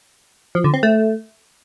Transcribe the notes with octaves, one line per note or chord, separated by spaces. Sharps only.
F3
D3
C4
A3